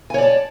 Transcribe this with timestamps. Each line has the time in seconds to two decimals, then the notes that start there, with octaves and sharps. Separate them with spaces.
0.10 G#5
0.14 C#5
0.18 D5
0.22 A5